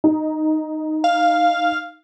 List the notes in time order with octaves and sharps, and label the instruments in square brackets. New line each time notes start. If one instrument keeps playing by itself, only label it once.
[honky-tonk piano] D#4
[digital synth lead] F5